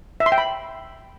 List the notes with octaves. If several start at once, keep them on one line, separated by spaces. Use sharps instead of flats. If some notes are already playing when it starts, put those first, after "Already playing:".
E5
C6
G5
B5